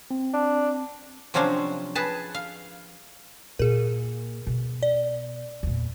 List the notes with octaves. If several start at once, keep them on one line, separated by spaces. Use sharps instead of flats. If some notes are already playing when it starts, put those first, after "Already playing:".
C4
D4
C3 F3 F#3 C#4 D4 C5
G#4 B4 A5
F5
A#2 G#4 A#4
B2
D5
E2 A#2